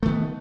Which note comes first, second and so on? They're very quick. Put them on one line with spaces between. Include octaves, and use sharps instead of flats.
A3 D#3 B3